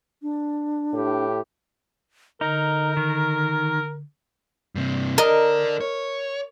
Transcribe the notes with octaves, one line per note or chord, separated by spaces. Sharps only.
D4
A2 G4
D3 D#4 A#4
D#3
G2 C3
A4 A#4 D5 D#5
C#5